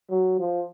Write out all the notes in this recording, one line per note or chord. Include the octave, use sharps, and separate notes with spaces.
F#3
F3